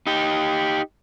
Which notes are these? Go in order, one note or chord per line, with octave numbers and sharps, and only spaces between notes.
D#4 G4